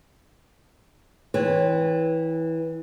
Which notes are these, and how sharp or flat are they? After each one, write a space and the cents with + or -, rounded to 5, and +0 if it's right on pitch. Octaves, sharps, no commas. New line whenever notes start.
E3 -15 C4 +0 C#5 +0